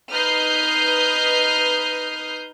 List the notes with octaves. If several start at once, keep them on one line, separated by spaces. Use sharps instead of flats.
D#4 B4 D#6 F6 G6 C7